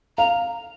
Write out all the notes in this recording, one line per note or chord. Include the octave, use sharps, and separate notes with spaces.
F5 A#5